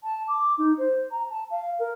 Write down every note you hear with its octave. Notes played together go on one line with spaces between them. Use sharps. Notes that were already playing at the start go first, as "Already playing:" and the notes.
A5
D6
D#4
C5
A#5
A5
F5
A#4